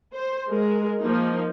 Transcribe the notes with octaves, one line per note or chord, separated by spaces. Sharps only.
C5
G#3 A#4
F3 A#3 D#4